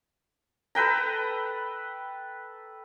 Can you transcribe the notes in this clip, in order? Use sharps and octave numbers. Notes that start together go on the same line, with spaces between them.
A4 B4 G5 A#5